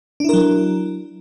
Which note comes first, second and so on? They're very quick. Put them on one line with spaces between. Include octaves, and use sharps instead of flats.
D4 E4 A#4 F#3